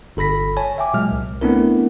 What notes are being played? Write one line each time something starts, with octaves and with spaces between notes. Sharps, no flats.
G1 A4 B5 A#6 B6
C#5 G#5 A5
E5 G5 G#5 D6
A#2 F#3 G#3 F6
C2
A3 B3 C4 D4 E4 A#4